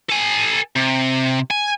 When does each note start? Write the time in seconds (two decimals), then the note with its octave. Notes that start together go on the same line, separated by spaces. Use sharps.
0.09 A4 G#5
0.76 C3
1.51 G#5